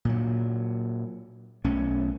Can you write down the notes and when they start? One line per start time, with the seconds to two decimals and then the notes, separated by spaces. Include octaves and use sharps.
0.05 A#2 F#3
1.64 B1 A3 C#4